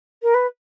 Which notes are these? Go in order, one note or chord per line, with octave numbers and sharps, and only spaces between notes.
A#4
B4